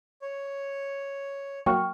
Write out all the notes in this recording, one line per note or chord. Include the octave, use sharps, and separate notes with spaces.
C#5
F#3 A#3 F#4 G5 C#6 F6